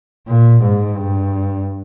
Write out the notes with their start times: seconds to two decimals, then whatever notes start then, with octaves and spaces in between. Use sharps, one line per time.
0.28 A#2
0.63 G#2
0.98 G2